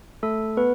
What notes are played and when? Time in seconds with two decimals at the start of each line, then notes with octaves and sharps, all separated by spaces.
0.23 A3 A4
0.57 B3 B4